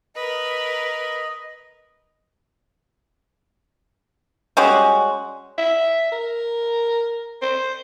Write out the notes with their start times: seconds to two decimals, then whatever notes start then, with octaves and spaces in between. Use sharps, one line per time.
0.15 A#4 B4 D#5
4.57 G3 G#3 C#4 F#4
5.58 E5
6.12 A#4
7.42 C5